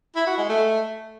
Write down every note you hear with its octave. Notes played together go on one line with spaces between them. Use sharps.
E4
F#4
G#3
A3